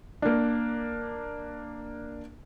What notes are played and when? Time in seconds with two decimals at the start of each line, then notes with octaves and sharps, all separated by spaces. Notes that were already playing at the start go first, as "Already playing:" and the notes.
0.22 A#3 D4